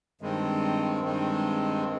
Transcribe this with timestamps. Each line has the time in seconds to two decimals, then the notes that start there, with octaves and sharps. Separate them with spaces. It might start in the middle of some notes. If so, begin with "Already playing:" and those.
0.21 G2 D#3 G#3 C4
1.03 G2 D#3 G#3 C4